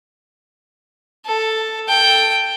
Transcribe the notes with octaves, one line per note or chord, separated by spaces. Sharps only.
A4
A4 G5